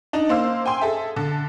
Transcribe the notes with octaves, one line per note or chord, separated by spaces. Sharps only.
D4 D#4
A#3 C5 F5 E6
G5 G#5 C6
G#4 A4 E5
D3 A5